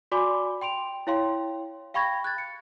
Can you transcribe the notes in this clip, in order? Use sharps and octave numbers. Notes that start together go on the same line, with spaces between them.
F#4 D5 G#5 B5 C6 D6
G5 C6 D7 F7
E4 C#5 F5 G5 C6
F5 G5 B5 C#6 G#6 A#6
F#6 G#6 A6
C#7